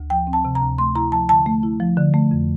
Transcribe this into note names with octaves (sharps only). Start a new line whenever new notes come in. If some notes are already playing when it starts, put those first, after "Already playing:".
Already playing: D2
F3 G5
C4
A5
C3
A#5
D2
A3 C6
E4 A#5
F3 A5
D3 A5
A3
E4
F3
D3
A3
F2